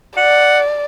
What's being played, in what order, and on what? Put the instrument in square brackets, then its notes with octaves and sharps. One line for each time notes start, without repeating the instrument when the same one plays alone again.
[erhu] D5 [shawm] F#5